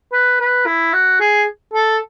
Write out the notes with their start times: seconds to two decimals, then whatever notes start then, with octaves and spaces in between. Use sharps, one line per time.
0.13 B4
0.40 B4
0.66 E4
0.93 F#4
1.21 G#4
1.74 A4